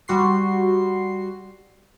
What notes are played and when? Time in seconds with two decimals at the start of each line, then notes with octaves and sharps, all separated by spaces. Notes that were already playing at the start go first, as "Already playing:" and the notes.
0.08 G3 F#4 C6 C7